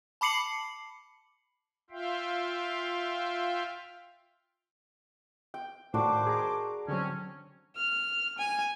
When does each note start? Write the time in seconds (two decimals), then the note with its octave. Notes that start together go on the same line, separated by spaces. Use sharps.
0.21 A5 B5 D6 C7 C#7 F#7
1.90 F4 E5 F5 G5
5.54 G5
5.94 A2 D#3 D4 F#4 C5 D6
6.27 G#4 A#5
6.88 D3 F#3 C4 C#4
7.76 F6
8.38 G#5